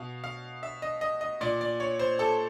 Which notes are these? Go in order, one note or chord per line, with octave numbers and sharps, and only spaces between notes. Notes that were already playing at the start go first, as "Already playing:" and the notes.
Already playing: B2 F5
F5
E5
D#5
D#5
D#5
A#2 D5
D5
C#5
C5
A4